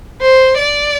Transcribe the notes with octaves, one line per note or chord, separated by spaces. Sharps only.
C5
D5